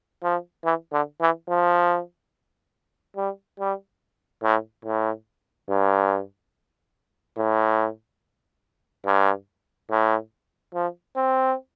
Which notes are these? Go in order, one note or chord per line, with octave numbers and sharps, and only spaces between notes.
F3
E3
D3
E3
F3
G3
G3
A2
A2
G2
A2
G2
A2
F3
C4